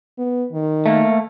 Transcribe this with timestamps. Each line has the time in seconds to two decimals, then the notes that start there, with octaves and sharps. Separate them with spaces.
0.18 B3
0.53 D#3
0.86 A3 A#3